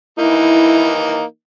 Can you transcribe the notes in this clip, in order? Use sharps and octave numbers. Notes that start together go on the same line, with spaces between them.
E3 A#3 D#4 E4